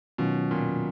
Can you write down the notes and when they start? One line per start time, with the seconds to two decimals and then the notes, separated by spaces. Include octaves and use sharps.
0.18 B2 D#3 F#3 C#4 F4
0.51 A#2